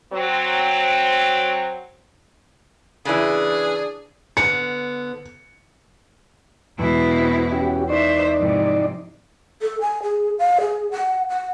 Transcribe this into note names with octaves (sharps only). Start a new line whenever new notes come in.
F#3 C4
C#3 E3 D4 G#4
D3 B3 C#7
E2 B2 G#3 E4
C4
C#4 F#4 G4
D#4 C5 D5 E5 C#6 F#6 C7
G#2 C3 F3 E4 A#4
A4
G#5
G#4
F5
G#4
F#5
F#5